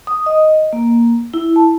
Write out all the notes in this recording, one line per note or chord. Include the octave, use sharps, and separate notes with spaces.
D#6
D#5
A#3
E4
A5